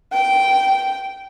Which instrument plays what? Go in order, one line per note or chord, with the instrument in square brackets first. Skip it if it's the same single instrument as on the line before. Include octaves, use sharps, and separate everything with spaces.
[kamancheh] G5